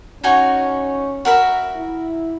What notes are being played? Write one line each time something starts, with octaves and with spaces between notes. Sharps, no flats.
C#4 D#4 F#4 C#5 G#5
F#4 A#4 E5 B5
E4